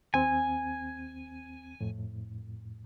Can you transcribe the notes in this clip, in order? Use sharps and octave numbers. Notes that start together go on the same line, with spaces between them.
D#2 C4 G#5
F2 A2